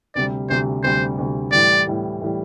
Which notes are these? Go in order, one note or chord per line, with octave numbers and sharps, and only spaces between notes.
D2 C3 G3 D5
D2 C3 G3 C5
D2 C3 G3 C5
D2 C3 G3
A2 E3 G3 D5
A2 E3 G3
A2 E3 G3